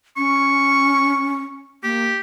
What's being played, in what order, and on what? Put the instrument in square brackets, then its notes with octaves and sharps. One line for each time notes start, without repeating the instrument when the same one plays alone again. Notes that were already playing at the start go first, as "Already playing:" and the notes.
[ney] C#4 [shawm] C#6
[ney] A#3 [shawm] G4